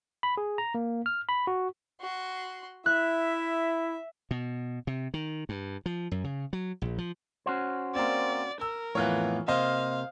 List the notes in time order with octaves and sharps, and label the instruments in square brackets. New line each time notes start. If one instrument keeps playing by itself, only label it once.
[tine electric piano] B5
G#4
A#5
A#3
F6
B5
F#4
[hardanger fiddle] F#4 C6
[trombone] E4 [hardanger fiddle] E5 [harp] F#6
[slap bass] B2
C3
D#3
G2
F3
F#2
C#3
F#3
A#1
F3
[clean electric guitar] C#4 F#4 C5
[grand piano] A#3 C4 [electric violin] D5
[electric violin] A#4 [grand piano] E6
[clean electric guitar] F2 A2 B3 [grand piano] E3 F4 C#5
[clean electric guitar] C3 A#3 [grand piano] C5 D#5 [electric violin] F5